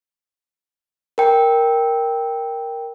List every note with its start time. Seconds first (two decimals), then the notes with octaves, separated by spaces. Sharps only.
1.18 A#4 G5